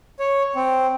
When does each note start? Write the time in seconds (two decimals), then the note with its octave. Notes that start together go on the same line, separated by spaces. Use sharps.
0.19 C#5
0.55 C4